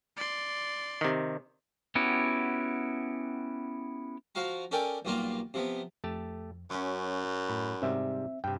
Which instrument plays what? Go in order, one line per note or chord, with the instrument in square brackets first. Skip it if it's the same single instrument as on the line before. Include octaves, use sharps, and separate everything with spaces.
[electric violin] D5 C6
[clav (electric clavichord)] C3 D#3
[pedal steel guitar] B3 C#4 E4 F#4 G4
[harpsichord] F3 F#4 F5 A#5
C#4 A4 A#4 D5 G5 G#5
B1 A#2 G3 A#3 F4 A#5
C3 F3 B3
[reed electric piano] F2 [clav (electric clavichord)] A3 G4 A5
[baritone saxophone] F#2 [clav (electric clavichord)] F#3 C#4 [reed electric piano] C#6
[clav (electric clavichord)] A2 [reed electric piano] B5
[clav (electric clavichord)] G#2 C3 G3 [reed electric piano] C4 E5
[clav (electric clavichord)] G2 C3 [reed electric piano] G5